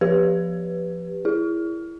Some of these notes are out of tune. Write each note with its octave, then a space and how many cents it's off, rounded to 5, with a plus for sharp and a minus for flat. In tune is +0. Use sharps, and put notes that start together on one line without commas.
F3 +0 G4 +10 B4 +0
E4 +20 G#4 +0